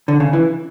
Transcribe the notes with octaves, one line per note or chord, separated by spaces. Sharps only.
D3
C#3
E3